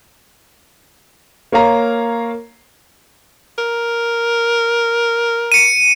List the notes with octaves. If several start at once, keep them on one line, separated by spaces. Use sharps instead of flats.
A#3 C#5 F5 A#5
A#4
C#7 D#7